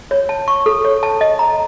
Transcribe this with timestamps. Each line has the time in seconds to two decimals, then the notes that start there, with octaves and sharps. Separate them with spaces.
0.11 C#5
0.29 A5
0.48 C#6
0.66 A4
0.85 C#5
1.03 A5
1.21 D#5
1.39 A#5